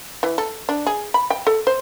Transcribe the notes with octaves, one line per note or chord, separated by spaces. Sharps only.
E3
A4
D4
G#4
B5
G5
A4
C5